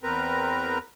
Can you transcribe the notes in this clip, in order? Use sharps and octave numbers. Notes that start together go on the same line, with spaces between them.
E2 C4 A#4 B4 A#5